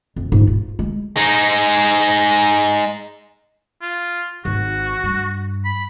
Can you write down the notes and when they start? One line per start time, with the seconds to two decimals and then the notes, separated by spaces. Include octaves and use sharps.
0.16 F2
0.32 G#2
0.47 F4
0.79 G#3
1.17 G#3 D#4
3.81 F4
4.45 G#1 F#4
5.03 G2
5.65 B5